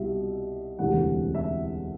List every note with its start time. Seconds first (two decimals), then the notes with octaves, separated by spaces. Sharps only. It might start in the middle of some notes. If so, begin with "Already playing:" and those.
Already playing: C2 B2 G3 E5
0.78 E1 D2 C3 E3 G3 F#5
1.35 E5